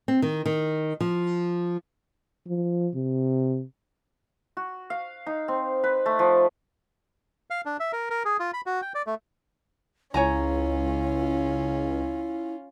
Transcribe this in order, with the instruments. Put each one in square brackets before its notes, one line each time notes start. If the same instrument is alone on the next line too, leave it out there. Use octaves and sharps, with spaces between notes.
[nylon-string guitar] C4
D#3
D#3
F3
[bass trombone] F3
C3
[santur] F#4
F5
D#4
C4
B4
A3
F3
[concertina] F5
D4
E5
A#4
A#4
G#4
F4
B5
F#4
G5
D5
A3
[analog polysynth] C#2 [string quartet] C#4 F4 [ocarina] E4 [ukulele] C#5 G#5 A#5